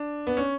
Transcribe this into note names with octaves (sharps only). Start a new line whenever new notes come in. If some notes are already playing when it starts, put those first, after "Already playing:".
Already playing: D4
B3
C#4